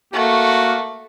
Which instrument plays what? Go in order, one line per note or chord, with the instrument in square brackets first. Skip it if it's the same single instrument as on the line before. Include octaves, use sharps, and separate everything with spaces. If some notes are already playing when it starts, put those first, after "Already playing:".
[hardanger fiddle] A3 [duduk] A#3 [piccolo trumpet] F#4